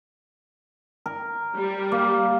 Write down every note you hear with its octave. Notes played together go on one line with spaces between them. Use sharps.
A#4
G3
A#3